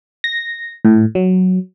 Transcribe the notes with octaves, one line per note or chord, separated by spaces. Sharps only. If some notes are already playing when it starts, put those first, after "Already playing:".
A#6
A2
F#3